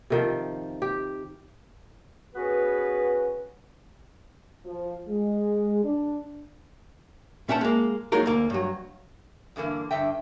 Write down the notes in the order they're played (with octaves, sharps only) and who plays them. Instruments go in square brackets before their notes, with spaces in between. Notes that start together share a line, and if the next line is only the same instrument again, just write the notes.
[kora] C3 D#3 F3
G4
[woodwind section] B3 C#4 F#4 G#4 B4
[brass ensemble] F3
G#3
D4
[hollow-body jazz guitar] A#2 C#4 E5 F#5 G5 A5
G#3 A#3
F#3 G#3 A#3 D#4 F4 A#4
D2 A#3
G2 F#3
[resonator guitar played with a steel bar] G2 D3 E3 A#3
G2 D3 E5 G5